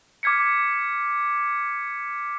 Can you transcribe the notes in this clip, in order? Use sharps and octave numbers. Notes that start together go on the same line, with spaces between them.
D6 F6 G#6 B6 C#7